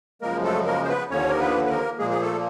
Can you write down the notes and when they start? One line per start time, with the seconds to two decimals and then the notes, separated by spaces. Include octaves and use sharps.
0.22 F#2 C#3 F3 G#3 A#3 A#4
0.44 A3 A4
0.66 A#3 A#4
0.83 C5
0.88 B3 B4
1.10 D#2 D3 F3 A#3 C#4 C#5
1.30 A#4
1.40 B3 B4
1.65 B4
1.69 A#3 A#4
1.99 A#2 F3 G#3 A#3 G#4
2.10 G#4
2.21 A3 A4